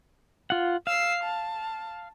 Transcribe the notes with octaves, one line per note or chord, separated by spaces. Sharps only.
F4 F#5
F5 E6 C7
A5